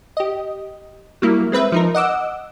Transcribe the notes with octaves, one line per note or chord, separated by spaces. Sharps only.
G4 D#5
F#3 G3 A#3 E4
G#3 C4 B4 E5
F3 D#4 A#4
D#5 F#5 D6 E6